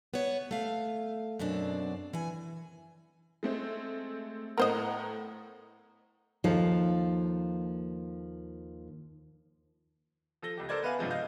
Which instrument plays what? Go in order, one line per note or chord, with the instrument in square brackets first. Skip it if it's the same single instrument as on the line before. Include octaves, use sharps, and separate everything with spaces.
[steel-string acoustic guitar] B3 C#5
A3 F5
F#2 B2 C4 D4
E3 G#5
[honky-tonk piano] G#3 A3 C4
[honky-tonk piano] A2 F#5 A#5 [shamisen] A#4 C5 D#5
[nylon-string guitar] D#2 F3 A#3 D#4 A4
[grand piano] F3 A4 A#6 G7
C#2 G4
A4 A#4 C5 D5 G#6
B3 B4 E5 F5 G#5
A1 G2 C3 F3 G#3
D#5 F5 G6